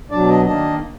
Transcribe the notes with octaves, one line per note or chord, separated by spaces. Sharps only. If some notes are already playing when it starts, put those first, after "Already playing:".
B2 F#3 D4 D5
D#5
D#3 A#3 D4 D#5